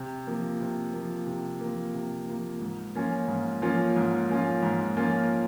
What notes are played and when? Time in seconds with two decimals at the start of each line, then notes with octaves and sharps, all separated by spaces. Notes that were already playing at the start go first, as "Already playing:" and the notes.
Already playing: C3
0.27 F3 A#3
0.61 C3
0.93 F3 A#3
1.27 C3
1.61 F3 A#3
1.94 C3
2.29 F3 A#3
2.61 G#2
2.95 F3 A#3 C#4 F4
3.28 G#2
3.62 F3 A#3 C#4 F4
3.96 G#2
4.29 F3 A#3 C#4 F4
4.63 G#2
4.97 F3 A#3 C#4 F4